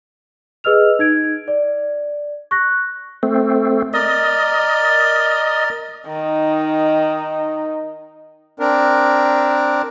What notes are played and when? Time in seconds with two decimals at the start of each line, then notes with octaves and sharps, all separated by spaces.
0.64 G#4 B4 D#5 E6 F6 F7
0.99 D#4 G#6 D7
1.48 D5
2.51 C#6 F#6 A#6
3.23 A3 C4
3.94 A#4 D5 D#5
6.07 D#3 D#4
8.60 C4 D4 A#4